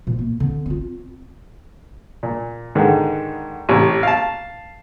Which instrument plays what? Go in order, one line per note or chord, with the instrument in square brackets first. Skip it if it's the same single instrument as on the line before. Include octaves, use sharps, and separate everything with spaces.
[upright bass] A#2 F3
A#3
D3 C4
C4 F4
[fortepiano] A#2
G#2 D3 D#3
A1 C3 C#5
F5 A5